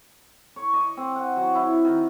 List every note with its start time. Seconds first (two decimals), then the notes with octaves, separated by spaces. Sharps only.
0.56 C#5
0.74 D#5
0.97 C4
1.16 F#5
1.36 F#3
1.55 E4
1.85 D#3